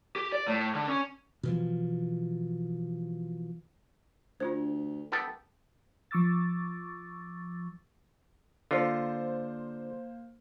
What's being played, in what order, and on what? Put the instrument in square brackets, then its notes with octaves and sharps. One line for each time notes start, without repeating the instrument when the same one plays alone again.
[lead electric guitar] G4
D5
A2
D3
C#4
[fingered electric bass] B2 E3 F3
[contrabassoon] D2 [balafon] D4 F4 C5
[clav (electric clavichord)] B3 G4 A4
[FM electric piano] F3 C#6 D6 E6 A6
[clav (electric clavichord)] D3 F4 [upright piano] A#3 C5